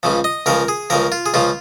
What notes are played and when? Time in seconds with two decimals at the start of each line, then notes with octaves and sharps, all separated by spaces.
0.03 C#2 C#3 F3
0.24 D#5
0.46 C#2 C#3 F3 A#4
0.68 G#4
0.90 C#2 C#3 F3 A#4
1.12 F4
1.26 G#4
1.34 C#2 C#3 F3 F4